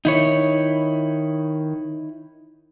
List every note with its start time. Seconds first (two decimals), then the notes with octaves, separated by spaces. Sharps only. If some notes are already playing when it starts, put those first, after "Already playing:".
0.05 D#3 D#4 E4 C#5